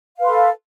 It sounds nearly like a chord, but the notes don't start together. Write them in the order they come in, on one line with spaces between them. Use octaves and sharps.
F5 B4 C6 A4